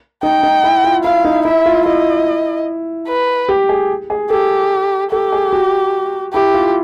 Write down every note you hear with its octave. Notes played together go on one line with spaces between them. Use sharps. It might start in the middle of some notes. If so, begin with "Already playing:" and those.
D#4 G5
D#4
E4
F4
E4 F5
D#4
E4 E5
F4
E4 D#5
B4
G4
G#4
G#4
G4 A4
G4 A4
G#4
F#4
E4 G4
F4